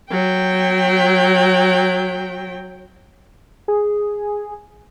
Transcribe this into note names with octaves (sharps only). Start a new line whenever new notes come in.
F#3 G5
G#4